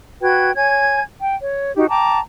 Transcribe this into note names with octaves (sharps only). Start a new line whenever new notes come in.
F#4 B4 G5 G#6
C#5 G#5 G#6
G5
C#5
D#4 F#4 G4
G5 A5 A#5 D6